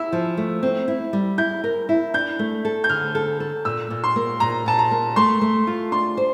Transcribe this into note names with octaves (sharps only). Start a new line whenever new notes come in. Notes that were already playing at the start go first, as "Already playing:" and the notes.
Already playing: E4 E6
F3
A3
C4
E4
G3
E4 G6
A#4
E4
D4 G6
A3
A4
G6
D3 F6
A4
A4
A#2 E6
A#2
C6
A#3
A#2 A#5
A#2 A5
A#5
A#3
A3 C6
A3
F4
D4 C6
C5